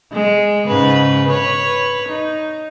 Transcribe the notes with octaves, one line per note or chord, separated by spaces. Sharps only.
G#3
G#2 C#3 B4
B4 C#5
D#4